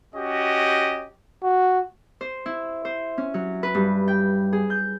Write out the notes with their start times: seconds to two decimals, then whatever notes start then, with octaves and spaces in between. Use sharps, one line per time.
0.15 C#4 F#4 G4 D#5
1.43 F#4
2.21 C5
2.46 E4
2.85 C5
3.18 C#4
3.34 F#3
3.63 B4
3.75 G2
4.08 G5
4.53 G#4
4.70 G6